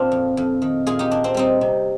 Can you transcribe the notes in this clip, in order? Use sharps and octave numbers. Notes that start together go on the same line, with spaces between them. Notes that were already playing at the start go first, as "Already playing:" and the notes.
Already playing: A#2 C4 D4 F4
F2
F2
D#3
A#2 F4 G#4
D#4 G4
A#2 D4
C4
G3 C4 D#4
C3